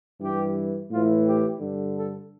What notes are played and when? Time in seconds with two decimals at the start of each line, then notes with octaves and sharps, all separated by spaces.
0.20 G2 E3 G4
0.89 A2 E3 F4
1.24 G4
1.59 G2 D3
1.94 A4